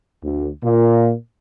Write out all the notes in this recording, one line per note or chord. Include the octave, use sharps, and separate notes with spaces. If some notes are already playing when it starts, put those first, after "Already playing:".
D2
A#2